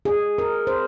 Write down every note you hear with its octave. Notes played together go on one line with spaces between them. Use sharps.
G#4
A#4
C5